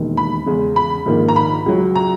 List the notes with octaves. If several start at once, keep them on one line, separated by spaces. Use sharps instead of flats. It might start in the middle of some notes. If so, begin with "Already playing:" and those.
Already playing: E1 D#2 D#3
B5
E2 C#3 G#3
B5
A#1 G#2 D#3 A#3
A#5
B5
C#2 C#3 F#3
A#5